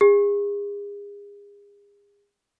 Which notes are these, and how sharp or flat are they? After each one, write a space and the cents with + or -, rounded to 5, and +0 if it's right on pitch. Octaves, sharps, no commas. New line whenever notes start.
G#4 -35